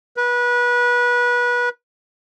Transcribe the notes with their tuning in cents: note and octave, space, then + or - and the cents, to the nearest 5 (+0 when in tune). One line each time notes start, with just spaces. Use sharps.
B4 -25